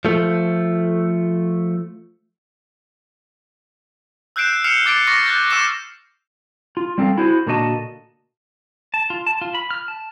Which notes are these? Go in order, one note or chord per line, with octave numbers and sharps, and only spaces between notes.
F3 A3
E6 F#6 G6 C7 D7 E7
F6 C7 C#7 E7 F7
D6 A6 C7 D7
C#6 D6 A6 A#6 C7
F#6 G6 A6
C#6 D6 E6 F6 C7 E7
F4
G3 C4 A4 A#4 F5
E4 F#4 G#4 C5
A#2 D3 A#3 F#4 D#5 A5
A5
F4
A5
F4
B5
F6
A5